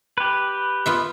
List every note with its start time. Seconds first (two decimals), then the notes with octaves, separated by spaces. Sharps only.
0.18 G4 B4
0.86 B3 F4 E5